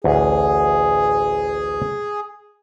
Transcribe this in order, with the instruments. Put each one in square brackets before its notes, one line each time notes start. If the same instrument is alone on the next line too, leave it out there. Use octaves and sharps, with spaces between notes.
[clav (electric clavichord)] A1 D2 [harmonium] G#4